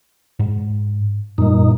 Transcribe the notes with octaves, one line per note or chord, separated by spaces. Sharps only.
G#2
F#2 A#2 G3 D#4